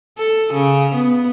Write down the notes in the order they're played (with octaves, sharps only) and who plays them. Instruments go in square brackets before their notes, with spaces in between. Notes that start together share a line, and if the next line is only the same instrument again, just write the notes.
[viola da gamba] A4
C#3
B3